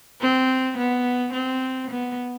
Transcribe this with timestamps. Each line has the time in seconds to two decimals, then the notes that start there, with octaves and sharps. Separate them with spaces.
0.21 C4
0.78 B3
1.33 C4
1.90 B3